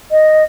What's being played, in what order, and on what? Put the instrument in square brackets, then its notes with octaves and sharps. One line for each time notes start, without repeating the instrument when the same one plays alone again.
[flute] D#5